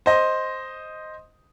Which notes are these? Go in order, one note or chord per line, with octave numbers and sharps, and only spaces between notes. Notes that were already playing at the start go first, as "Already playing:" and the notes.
C5 D#5